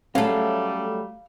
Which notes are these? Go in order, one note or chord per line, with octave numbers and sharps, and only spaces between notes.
F#3 G3 A3 C#4 G#4 A4 F5